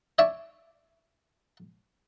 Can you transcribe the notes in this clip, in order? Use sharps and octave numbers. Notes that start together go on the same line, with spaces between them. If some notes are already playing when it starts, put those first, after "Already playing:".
C#5 D5 E5